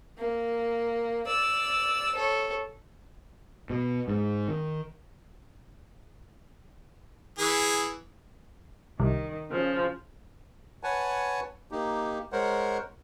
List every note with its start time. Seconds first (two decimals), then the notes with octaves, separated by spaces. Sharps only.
0.18 A#3
1.27 D5 E6
2.15 A4 C#5
3.70 B2
4.08 G#2
4.48 D#3
7.39 E3 G#4
9.00 C2 D#3
9.51 C#3 F3
10.83 B4 C#5 F#5 G#5 A5
11.71 A#3 D#4 G4
12.33 G#3 A#4 C5 C#5 F#5